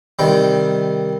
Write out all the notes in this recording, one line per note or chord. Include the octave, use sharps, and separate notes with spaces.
C3 D#3 G3 G5